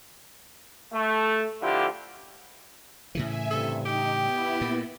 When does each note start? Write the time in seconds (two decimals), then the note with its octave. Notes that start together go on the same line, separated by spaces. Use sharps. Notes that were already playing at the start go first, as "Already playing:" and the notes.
0.92 A3
1.62 D3 F3 E4 F4 G4
3.15 A2 C#3 E3 E5 G#5
3.50 G2 C3 A4
3.86 D#4 G4 D5 D#5 G5
4.22 B3 E4
4.61 A#2